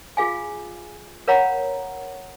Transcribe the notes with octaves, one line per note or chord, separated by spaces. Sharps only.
F4 G#4 F5 G#5
A#4 C#5 F5 F#5 A#5 B5